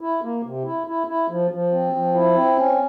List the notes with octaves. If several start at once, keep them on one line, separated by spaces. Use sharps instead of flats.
E4
A#3
C3
E4
E4
E4
F3
F3
C4
F3
E4
C4
C#4